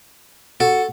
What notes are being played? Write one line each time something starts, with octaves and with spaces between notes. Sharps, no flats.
F#4 A4